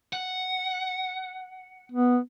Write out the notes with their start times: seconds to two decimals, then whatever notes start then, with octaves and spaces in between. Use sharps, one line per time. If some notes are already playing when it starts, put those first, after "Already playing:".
0.13 F#5
1.92 B3